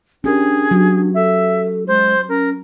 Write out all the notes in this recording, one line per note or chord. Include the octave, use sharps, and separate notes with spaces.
C#4 D4 G4 G#4 A#4
F#3 F#4
A4 E5
G#3 C5
C#4 A#4